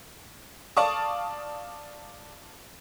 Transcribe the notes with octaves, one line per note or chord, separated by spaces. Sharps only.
D5 F5 A5 C#6 D#6